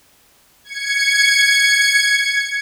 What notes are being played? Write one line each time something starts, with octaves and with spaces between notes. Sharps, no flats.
G#6 C#7